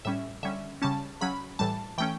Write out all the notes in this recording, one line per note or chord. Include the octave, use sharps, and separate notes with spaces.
A2 G3 C#4 E5
D3 G3 C#4 E5
C#3 G3 C#4 A5
C#3 F#3 C#4 B5
A2 E3 G3 A5
E3 A3 C#4 G5